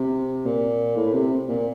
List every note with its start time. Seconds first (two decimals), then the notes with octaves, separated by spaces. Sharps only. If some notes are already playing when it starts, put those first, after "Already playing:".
Already playing: C3
0.46 A#2
0.96 A2
1.14 C3
1.48 A#2